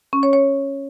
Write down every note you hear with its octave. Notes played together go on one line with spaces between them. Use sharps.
C#4
C#5
C#5